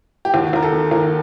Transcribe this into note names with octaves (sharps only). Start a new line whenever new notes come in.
G4
D#2 F#4
D#2 A#4
A4
D#3
D#2 A#4